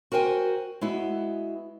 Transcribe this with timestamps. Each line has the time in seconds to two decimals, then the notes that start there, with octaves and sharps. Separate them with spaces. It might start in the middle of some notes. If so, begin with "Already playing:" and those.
0.12 F#4 A#4 C5 G5 G#5
0.81 G#3 B3 E4 F#4